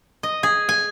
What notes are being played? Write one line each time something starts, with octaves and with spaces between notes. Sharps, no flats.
D#5
G#4
G#5